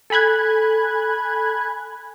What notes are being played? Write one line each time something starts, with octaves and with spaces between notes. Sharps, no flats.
A4 G#5 B5 F#6 G#6